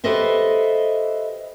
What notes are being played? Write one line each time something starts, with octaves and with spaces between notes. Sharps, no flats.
G4 A4 B4 C5 D#5 E5